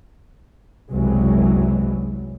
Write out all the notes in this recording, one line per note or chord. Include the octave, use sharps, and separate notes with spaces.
F#1 C2 E3 F#3 G#3